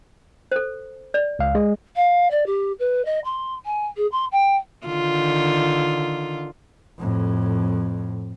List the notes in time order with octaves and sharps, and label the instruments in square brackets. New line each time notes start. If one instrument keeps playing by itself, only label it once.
[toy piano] A4 C5
D5
[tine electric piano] C#2 F5
G#3
[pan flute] F5
D5
G4
B4
D#5
C6
G#5
G#4
C6
G5
[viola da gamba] D3 D#3 F4
[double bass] F2 A2